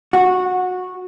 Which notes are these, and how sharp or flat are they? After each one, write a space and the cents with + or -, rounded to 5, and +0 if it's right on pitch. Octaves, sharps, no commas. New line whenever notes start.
F#4 -15